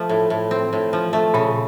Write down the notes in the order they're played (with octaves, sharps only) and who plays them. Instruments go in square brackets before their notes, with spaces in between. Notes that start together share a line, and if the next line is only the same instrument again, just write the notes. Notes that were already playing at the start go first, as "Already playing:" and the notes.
Already playing: [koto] F3 A3
A2
A2
C4
A2
F3
A3
[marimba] A#2 [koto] C#3